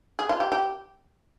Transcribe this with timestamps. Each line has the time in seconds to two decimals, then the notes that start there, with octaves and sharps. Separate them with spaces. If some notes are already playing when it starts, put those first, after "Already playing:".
0.19 G#4
0.29 F4
0.40 G4
0.52 G4